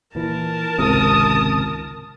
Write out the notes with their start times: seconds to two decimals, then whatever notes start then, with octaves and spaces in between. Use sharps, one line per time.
0.15 A#2 E3 A#4 A5
0.79 G#1 C#2 C3 D#6